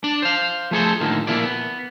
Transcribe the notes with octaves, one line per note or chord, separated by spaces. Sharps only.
D4 D5
C5 F5
F3 A3 G#4 A4 C5
A2 D3 D#3 F3 A#3
A#2 C#3 F3 A#3 E4 D5
B3